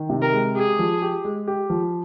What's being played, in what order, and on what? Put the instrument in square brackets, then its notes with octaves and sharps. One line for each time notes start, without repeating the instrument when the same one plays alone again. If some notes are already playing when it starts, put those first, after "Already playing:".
Already playing: [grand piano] D#3
C3
[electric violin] A#4
[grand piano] G#3
[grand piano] G4 [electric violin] G#4
[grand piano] F3
G4
G#3
G4
F3